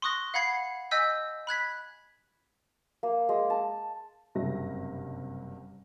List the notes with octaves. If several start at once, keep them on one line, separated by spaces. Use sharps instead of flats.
C6 C#6 D#6 F#6 A#6
F5 F#5 B5 G#6 C7
D#5 G#5 E6 G6 B6
B5 F#6 G#6 B6
A#3
G#3
A5
F#1 G2 C3 G3 E5 A#6